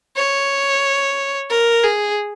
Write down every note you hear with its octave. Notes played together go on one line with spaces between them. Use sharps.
C#5
A#4
G#4